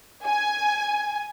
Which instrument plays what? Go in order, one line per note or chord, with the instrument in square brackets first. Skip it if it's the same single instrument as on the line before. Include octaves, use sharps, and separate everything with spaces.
[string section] G#5